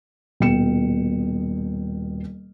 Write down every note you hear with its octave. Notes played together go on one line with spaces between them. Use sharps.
D#1 B2 G5 C#7 E7